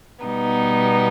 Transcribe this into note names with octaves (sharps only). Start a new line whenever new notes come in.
B2 G3 B3 D#4